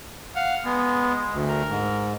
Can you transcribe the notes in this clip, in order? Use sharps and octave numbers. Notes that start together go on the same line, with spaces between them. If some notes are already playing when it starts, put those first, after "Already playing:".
F5 F#5
G#3 B3
D2
A#4
G#2